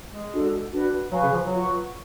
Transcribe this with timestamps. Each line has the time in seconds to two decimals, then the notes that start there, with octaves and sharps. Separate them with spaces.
0.10 G#3
0.31 D4 F#4 A4
0.72 D4 F#4 B4
1.12 F#3 B4 F5 G#5 C#6
1.22 C#3
1.33 F3
1.43 F#3
1.53 F4 B4 F#5 C#6